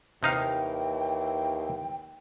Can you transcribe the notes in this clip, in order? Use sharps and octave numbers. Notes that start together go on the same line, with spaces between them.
D#2 C3 E3 D#4 F5 G5